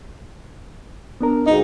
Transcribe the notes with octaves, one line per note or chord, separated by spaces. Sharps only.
B3 D4 A#4
D2 G#2 D#4 D#5